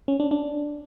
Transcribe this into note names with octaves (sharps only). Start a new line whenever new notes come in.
C#4
D4
D4